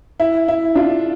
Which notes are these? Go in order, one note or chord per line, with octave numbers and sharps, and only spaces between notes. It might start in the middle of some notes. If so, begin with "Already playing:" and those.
E4
E4
D4 F4